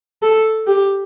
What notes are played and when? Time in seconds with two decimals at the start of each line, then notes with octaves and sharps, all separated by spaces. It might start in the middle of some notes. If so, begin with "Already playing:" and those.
0.22 A4
0.67 G4